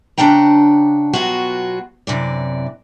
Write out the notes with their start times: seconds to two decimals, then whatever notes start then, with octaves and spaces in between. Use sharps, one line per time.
0.18 C#3 A3 D4 F#5 G5 A#5
1.13 B2 F#3 F4 F#4
2.07 F#2 C3 E3 D5